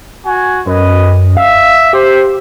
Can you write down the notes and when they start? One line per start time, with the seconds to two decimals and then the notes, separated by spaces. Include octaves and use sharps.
0.25 F#4 G#5
0.66 F#2 B4 D#5
1.37 E5 F5
1.93 G4 C5